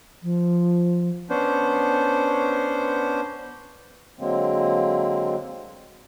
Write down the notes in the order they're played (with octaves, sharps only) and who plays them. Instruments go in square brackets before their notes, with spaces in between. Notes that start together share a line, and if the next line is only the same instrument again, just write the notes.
[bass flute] F3
[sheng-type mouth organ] B3 C#4 D4 C5
[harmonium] D3 F#3 G#3 A#3 C4